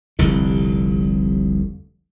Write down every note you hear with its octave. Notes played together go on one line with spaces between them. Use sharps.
F1 C2 D3